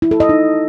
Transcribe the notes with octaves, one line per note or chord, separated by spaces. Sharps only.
E4
A4
D#5
D#4